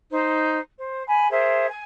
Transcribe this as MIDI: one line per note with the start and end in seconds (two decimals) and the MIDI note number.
0.10 0.58 63
0.10 0.58 72
0.77 1.04 72
1.06 1.28 80
1.06 1.28 83
1.30 1.65 68
1.30 1.65 70
1.30 1.65 72
1.30 1.65 76
1.66 1.84 80